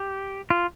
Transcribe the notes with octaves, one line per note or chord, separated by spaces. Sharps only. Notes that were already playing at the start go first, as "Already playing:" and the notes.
Already playing: G4
F4